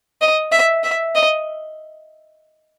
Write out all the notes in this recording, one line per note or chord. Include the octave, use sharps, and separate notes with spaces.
D#5
E5
E5
D#5